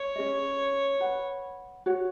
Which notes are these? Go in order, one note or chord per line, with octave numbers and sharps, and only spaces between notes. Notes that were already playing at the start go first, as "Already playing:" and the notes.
Already playing: C#5
C#4 G#4 D#5
B4 F#5 B5
F#4 C#5 F#5